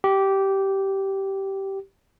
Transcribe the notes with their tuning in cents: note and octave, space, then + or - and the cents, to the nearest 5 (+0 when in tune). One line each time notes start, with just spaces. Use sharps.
G4 -15